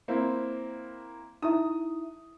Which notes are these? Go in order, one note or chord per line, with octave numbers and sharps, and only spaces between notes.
A#3 C4 E4
D#4 E4 E5 D#6